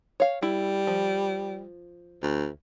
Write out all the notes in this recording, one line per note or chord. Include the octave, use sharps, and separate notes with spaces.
C#5 F5
G3 E4
F3
D2